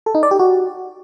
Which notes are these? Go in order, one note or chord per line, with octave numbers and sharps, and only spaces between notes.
A4
D#4
D5
G4
F#4